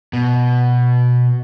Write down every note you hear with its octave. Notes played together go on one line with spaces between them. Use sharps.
B2